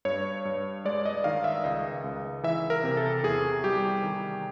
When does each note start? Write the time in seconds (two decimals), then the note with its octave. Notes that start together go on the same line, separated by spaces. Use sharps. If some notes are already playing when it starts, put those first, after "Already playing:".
0.05 G2 C#5
0.45 G2
0.85 G#3 D5
1.06 D#5
1.24 D#3 F5
1.44 E5
1.64 C#2 D#5
2.04 C#2
2.43 E3 E5
2.70 A#4
2.84 C3
2.97 A4
3.23 E2 G#4
3.64 G3 G4
4.03 D#3